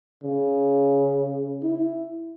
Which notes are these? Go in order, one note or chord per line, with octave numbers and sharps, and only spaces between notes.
C#3
E4